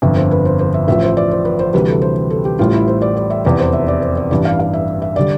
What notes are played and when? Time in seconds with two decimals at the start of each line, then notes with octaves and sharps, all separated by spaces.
0.02 G1 F2 D3 F3 E5
0.16 C5
0.31 B4
0.45 C5
0.59 C5
0.74 E5
0.88 A1 A2 F3 E5
1.03 C5
1.17 D5
1.31 C5
1.45 B4
1.59 C5
1.73 D2 C3 E3 G3 B4
1.88 A4
2.02 C5
2.30 A4
2.45 G4
2.59 A1 A2 G3 F4
2.74 E4
2.88 C5
3.02 D5
3.17 D5
3.30 E5
3.45 F1 E2 C3 D5
3.59 C5
3.73 E5
3.88 D5
4.02 C5
4.17 D5
4.31 A1 G2 E3 G3 D5
4.45 F5
4.60 F5
4.73 E5
5.02 E5
5.16 D3 G3 D5